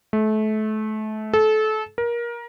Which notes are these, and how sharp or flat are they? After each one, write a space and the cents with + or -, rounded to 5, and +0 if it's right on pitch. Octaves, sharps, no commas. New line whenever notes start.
A3 -30
A4 -25
A#4 +25